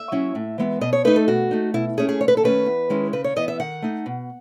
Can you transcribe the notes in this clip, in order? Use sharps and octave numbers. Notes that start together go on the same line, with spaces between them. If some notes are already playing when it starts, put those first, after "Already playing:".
Already playing: E5
F#3 C#4 E4
A2
E3 G#3 B3
B2 D#5
C#5
A3 D#4 B4
A4
B2 F#4
A3 D#4
B2 E4
A3 C#4 E4 G#4
G#4
D#2 C#5
B4
A4
D#3 A3 C#4 B4
E2
D#3 G#3 C#4 E4
C#3 B4
C#5
E3 B3 D#5
E5
D#3 F#5
A3 D#4
B2